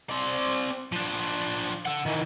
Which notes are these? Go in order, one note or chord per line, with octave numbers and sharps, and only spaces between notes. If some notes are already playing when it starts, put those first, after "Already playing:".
C4 D5
F3 D4
A4 F#5
D#3 E3